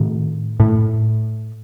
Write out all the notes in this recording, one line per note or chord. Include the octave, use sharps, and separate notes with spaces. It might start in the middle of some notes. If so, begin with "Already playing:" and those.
Already playing: A2 D#3
A2